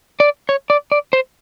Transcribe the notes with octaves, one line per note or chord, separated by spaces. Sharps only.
D5
C#5
D5
D5
C5